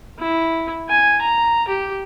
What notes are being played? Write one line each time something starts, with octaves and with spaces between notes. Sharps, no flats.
E4
G#5
A#5
G4